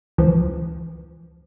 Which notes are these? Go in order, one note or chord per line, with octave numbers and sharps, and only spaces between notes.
C#2 E3 F3